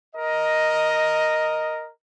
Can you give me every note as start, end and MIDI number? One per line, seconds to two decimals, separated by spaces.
0.15 1.89 70
0.15 1.89 75